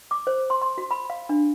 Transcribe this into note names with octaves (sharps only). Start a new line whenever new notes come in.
D6
C5
C6
C6
F#4
B5
F5
D4